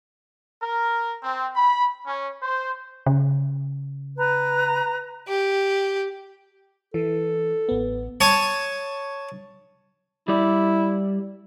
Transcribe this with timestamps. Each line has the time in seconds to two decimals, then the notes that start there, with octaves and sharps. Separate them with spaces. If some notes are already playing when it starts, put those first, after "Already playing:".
0.61 A#4
1.23 C4
1.55 B5
2.06 C#4
2.43 C5
3.06 C#3
4.18 B4 A#5
5.28 G4
6.94 E3 A4
7.69 A1 B3
8.21 C#5 A5 D#6
10.28 G3 E4 D5